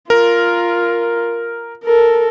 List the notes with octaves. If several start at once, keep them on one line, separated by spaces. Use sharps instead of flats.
F4 A#4
A4 A#4